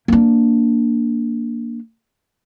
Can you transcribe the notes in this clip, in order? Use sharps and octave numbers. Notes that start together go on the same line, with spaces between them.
A#3 D4